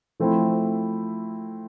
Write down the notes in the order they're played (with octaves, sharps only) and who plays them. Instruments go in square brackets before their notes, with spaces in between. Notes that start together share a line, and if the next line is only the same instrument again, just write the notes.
[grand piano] F3 A3 C4 E4